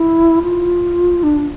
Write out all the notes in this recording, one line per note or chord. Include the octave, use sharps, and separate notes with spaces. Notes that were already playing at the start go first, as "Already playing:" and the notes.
Already playing: E4
F4
D4